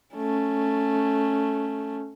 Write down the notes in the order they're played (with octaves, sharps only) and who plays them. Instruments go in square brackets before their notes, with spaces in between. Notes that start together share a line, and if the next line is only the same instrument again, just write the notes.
[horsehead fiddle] A3 C#4